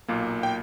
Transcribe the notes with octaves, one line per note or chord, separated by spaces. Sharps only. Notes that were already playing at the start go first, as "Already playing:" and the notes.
B1 A#2 A#3
G5